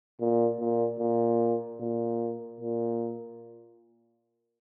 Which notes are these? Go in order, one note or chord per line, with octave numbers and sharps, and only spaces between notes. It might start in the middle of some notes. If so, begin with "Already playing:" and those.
A#2
A#2
A#2
A#2
A#2